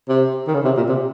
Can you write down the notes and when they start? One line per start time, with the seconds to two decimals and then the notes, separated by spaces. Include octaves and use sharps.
0.09 C3
0.47 D#3
0.54 C#3
0.65 C3
0.77 A#2
0.88 C3